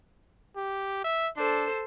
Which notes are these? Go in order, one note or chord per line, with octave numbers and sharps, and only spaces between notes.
G4
E5
D4 A4 C5